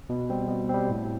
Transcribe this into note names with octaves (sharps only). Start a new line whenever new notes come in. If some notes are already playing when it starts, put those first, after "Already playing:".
B2
G3 C4
B2
G3 C4
A2